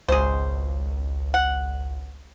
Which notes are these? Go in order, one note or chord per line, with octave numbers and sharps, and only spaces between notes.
G#1 C#2 G#4 C5
F#5